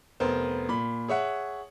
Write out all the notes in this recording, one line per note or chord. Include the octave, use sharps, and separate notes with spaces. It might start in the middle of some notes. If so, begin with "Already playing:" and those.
F1 B3 A#4 C5
A#2 B5
G#4 C#5 E5 F#5